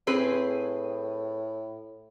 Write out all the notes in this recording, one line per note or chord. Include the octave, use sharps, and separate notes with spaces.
A2 C4 G#4 B4